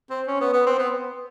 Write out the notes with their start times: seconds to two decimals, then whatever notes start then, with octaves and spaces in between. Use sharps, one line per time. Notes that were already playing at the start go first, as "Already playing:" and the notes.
0.10 C4
0.27 C#4
0.41 B3
0.53 B3
0.66 C4
0.79 B3